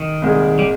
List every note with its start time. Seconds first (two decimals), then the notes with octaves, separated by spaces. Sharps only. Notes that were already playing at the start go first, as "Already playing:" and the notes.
Already playing: D#3
0.22 C2 A#2 G#3
0.59 G3